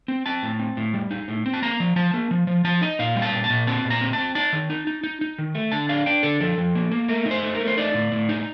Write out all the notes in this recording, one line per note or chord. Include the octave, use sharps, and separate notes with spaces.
C4
C4 A5
A2
C4
A2
G3
D#4
A2
C4
A5
A#3 A#5
F3
F3 A5
A#3
F3
F3
F3 A5
D#4 D#5
A#2 F5
G3
A5
A#2
A5
A#2
C4 A5
A#2
A#5
C4
C4 A5
D#4 A5
D#3
D#4
D#4
D#4
D#4
D#3
A3
D3 A5
D4 F5
D4 G5
D3 A4
F3 A4
F3
A#3
A#3
A3 A#4
D#4
C5
A3
A#4
A3
C5
D#4 D5
A2
A2
D#4